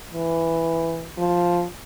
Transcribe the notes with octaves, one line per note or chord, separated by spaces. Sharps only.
E3
F3